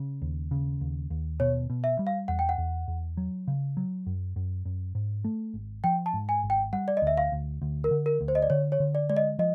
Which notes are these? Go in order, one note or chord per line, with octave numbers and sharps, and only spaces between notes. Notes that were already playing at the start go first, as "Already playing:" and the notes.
Already playing: C#3
D#2
C#3
D#2
D#2
B2 C#5
B2
E5
G3
F5
E2 F#5
G5
F#5
E2
E2
F#3
C#3
F#3
F#2
F#2
F#2
G#2
A3
G#1
F3 G5
A5
G#2
G#5
G#1
G5
G3 F#5
D5
D#5
D2 E5
F5
D2
D2
A#4
D3
A#4
D2
C5
D#5
D5
D3 C#5
C#5
D3
D5
G#3 D5
D#5
F3 D#5